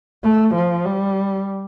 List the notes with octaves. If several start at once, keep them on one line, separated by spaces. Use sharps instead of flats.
A3
F3
G3